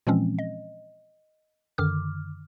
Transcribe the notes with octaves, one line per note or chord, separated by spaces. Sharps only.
A#2 E3 F3 G#3 C4 C#4
D#5
F#2 D3 D#3 D6 F6